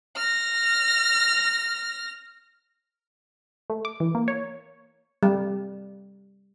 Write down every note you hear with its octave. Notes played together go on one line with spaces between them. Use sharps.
F6 A#6
A3
D6
E3
A#3
C#5
G3